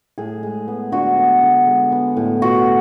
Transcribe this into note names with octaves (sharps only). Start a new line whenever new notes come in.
A2 G#4
G#3
B3
D3 F#4
B3
D3
G#3
B3
A2
B2 F#4